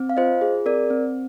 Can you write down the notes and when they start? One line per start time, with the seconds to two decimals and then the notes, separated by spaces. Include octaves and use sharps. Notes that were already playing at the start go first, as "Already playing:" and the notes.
Already playing: C4
0.09 F5
0.17 F4 C5 D#5
0.41 G#4
0.66 C4 A#4 D5
0.90 C4